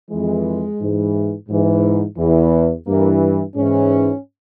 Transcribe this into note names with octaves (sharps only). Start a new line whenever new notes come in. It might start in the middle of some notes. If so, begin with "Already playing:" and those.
F2 E3 G#3
G#2 E3
G#2 E3
E2 E3
G2 E3 A#3
G#2 E3 C#4